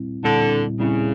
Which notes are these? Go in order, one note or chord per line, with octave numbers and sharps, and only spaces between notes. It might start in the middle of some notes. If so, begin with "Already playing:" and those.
Already playing: A#2 G3 C4 E4
A#2 D3 G3 C4 E4
A#2 C#3 G3 C4 E4